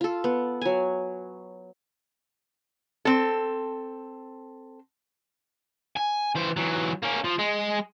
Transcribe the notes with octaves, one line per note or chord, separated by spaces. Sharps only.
F4 A4
B3
F#3 G#5
C4 A4
G#5
E3 C5
E3 F#3
A#3 C#4
F3
G#3